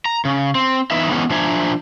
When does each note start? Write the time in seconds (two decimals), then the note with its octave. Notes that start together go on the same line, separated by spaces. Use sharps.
0.06 A#5
0.25 C#3
0.55 C4
0.91 E3 B3 D#4 D#5 E5
1.10 E3 G#3 B3 C#4 D#4
1.30 F3 D4 C5 E5 G#5 A#5